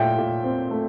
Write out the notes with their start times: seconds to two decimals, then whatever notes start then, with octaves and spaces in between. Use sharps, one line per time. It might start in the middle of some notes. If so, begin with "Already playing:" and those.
Already playing: A#2 A3 E5 G5
0.18 A#2
0.44 C4
0.71 A3